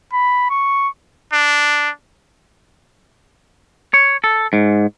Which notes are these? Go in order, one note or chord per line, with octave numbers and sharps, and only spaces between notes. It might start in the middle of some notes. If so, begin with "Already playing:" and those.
B5
C#6
D4
C#5
A4
G#2